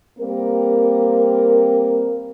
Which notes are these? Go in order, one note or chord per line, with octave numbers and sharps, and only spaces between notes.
G3 A#3 C4 A#4